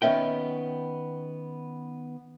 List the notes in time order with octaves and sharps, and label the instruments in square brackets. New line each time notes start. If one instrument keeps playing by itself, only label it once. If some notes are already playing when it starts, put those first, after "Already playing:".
[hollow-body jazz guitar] D#3 B3 C#4 E5 G5